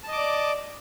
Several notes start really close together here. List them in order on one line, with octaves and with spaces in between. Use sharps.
A5 D#5 D6 D5